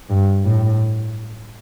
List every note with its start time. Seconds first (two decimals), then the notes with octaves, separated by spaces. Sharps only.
0.10 G2
0.45 A2